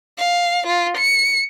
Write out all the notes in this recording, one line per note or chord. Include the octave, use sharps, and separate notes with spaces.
F5
F4
C#7